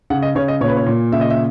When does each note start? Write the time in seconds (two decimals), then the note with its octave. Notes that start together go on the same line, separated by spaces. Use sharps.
0.10 C#3 F#5
0.22 D#5
0.35 C#3 C#5
0.48 D#5
0.61 A#2 C#5
0.68 B4
0.77 C#5
0.87 A#2
1.12 C#3 E5
1.21 D#5
1.30 E5